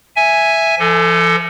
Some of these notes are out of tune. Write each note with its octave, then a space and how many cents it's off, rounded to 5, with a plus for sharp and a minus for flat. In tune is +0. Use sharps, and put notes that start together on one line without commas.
E5 +0 G#5 +0
F3 -40 A4 +15